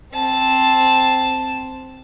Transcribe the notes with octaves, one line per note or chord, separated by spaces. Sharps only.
C4 A5